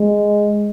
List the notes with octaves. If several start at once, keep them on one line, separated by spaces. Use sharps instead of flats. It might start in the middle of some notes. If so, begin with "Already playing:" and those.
Already playing: G#3